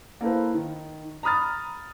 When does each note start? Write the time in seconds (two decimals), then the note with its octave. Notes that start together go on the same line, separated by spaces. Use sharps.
0.21 A#3 E4 A4 B4 C5
0.54 D#3
1.23 A#5 B5 D#6 F6 A6